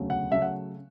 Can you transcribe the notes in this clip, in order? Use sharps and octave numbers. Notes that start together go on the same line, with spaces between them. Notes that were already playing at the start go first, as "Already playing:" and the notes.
Already playing: E1 D2 C#3 F#3 A3
F#5
C#3 F#3 A3 E5
F#5